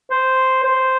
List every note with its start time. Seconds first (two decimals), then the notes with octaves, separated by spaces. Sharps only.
0.11 C5
0.64 C5